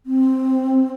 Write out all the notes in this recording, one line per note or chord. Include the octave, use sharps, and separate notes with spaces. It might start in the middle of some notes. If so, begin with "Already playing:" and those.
C4